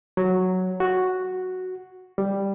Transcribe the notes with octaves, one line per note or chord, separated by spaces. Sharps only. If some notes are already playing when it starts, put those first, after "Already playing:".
F#3
F#4
G3